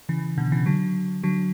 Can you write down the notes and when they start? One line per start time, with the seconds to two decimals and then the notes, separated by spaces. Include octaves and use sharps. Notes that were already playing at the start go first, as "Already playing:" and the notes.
0.09 C#3 E3
0.38 B2 D3
0.52 C#3 E3
0.66 D3 F#3
1.23 D3 F#3